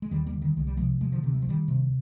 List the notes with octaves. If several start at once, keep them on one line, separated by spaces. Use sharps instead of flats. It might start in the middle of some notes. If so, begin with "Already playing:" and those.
G#3
D#2 D#3 G3
G3 A#3
D3
D#3 G3
C2 G#3
G3
C3 F3 G#3
D2 F3 G#3
D3 F3
C3 D#3
G3
F3
D2 D#3 G3
C3